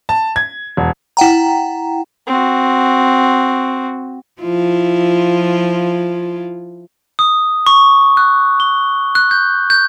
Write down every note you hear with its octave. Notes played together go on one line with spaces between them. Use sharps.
A5
G#6
E1
E4 F#5 G5 A#5
C4 F#4
F3 E4 F4
D#6
C#6
F#6
G7
F#6
G6
G6